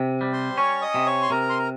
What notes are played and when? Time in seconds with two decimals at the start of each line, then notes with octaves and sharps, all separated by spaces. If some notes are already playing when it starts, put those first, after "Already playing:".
Already playing: C3
0.21 G3
0.33 C5 C6
0.57 C#4 C#5 C#6
0.82 D#5 D#6
0.94 C3
1.06 C#5 C#6
1.22 C6
1.30 C3 A#4 A#5
1.49 C6
1.59 A#5